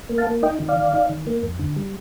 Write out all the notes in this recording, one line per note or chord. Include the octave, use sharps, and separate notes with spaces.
A#3
F5 A5
A#3
D#4 D#5 G5
D#3
D5 F5
D#3
D#4
D#3
A#3
F2
D3
G3